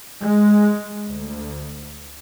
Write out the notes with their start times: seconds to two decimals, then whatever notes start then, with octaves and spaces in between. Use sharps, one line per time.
0.22 G#3
1.09 D2